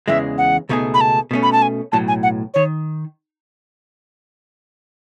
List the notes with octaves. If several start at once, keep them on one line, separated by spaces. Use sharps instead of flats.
E2 C#3 E3 G#3 E5
F#5
C#2 B2 A3 D#4 G#4
B5
A5
B2 A3 C#4
B5
A5
G#5
B1 A2 F#3 A5
G#5
F#5
D#3 C#5